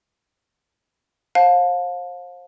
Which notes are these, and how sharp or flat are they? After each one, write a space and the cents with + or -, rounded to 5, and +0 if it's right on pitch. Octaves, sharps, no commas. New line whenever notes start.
C5 +30 F5 +30 A5 +0